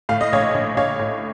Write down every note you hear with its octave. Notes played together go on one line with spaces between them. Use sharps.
A2 F5
D#5
A#1 C#5 F5
A#1
A#1 C#5 F5
A2